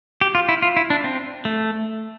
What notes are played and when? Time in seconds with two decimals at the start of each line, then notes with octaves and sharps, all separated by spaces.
0.21 G4
0.35 F4
0.49 E4
0.62 F4
0.77 E4
0.90 D4
1.04 C4
1.45 A3